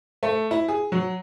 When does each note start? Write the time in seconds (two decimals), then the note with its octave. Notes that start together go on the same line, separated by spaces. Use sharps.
0.23 A3
0.51 E4
0.68 G#4
0.92 F#3